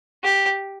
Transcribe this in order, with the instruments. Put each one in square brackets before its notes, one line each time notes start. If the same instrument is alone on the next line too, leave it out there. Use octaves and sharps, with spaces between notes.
[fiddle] G4